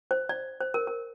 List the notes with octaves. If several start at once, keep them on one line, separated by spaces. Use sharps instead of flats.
C5
D5
C5
A#4
A#4